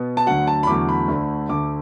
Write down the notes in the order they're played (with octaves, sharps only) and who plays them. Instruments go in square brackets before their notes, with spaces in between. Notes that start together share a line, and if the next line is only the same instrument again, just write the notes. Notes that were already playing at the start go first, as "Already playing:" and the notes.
Already playing: [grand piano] B2 B3
A5
D2 D3 F#3 F#5
A5
B5
E2 D3 F#3 A3 D6
B5
D2 D3 A3 D4
D2 D3 A3 D6